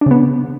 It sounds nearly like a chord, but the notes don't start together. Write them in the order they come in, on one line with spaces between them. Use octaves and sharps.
D4 C#3 B3